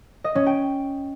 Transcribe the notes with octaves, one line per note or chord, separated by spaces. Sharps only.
D#5
C#4
G5